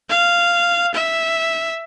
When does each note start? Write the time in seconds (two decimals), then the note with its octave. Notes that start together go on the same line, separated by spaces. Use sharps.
0.09 F5
0.94 E5